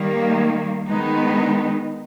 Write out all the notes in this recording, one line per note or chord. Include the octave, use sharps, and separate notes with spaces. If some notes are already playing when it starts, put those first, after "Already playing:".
Already playing: D#3 G3 A#3
D#3 G#3 B3 D#4